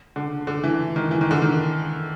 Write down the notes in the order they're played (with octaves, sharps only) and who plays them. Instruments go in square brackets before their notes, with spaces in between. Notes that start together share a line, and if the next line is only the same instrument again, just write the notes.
[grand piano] D3
D3
E3
D#3
E3
D#3
D3
D#3